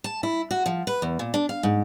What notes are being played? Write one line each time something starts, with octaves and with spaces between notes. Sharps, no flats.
A5
E4
F#4
F3
B4
E2
A#2
D4
F5
G#2